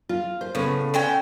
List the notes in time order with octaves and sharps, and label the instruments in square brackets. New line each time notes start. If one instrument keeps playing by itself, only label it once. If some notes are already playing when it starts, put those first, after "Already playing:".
[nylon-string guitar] F4
C5
[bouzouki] A2 [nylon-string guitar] C#3 B3
[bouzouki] D3 C#4 G5